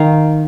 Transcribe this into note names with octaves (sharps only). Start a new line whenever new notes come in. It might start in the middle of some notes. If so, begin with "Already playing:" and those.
Already playing: D#3 F5